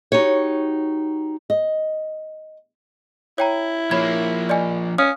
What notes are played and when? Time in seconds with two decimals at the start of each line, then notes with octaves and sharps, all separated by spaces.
0.12 D#4 F#4 G4 C#5
1.50 D#5
3.38 E4 C#5 G5 A#5
3.91 F3 A#3 C#5 B5 G#6
4.49 D5 D#5 G#5
4.98 C#4 F5 D#6 F6